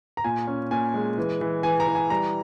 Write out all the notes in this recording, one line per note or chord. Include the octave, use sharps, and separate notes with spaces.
A#5
A#2 G#5
C#4
A#2 G#5
G#3
E3
E3
E3 G#5
A#5
E3
G#5
G3 A#5